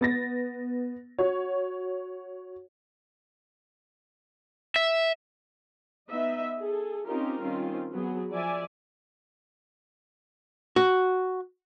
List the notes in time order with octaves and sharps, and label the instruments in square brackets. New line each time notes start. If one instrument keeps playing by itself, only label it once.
[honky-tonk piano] B3 A6 A#6
F#4 C#5
[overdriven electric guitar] E5
[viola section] B3 D#4 D#5 E5
G#4 A4
C4 C#4 D#4 F4 G4 A#4
D#3 G3 C4 C#4 F4
F#3 B3 G#4
F3 D5 E5 G#5
[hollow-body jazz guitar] F#4